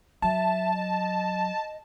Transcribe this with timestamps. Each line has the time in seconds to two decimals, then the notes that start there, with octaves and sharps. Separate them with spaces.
0.22 F#3 E5 A5
0.74 D#5